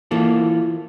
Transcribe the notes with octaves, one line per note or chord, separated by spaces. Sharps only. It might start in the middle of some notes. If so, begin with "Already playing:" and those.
E3 A#3 F4 A4